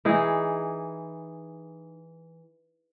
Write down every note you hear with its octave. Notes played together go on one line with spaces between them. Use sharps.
E3 D#4 G#4